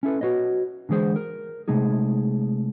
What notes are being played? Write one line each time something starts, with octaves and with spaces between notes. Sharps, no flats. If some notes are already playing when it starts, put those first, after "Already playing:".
C#4 E4 A4 B4
F#4 B4 C#5 D#5
D3 E3 G#3 G#4 C5
A#4
C3 G#3 A3 D#4 G#4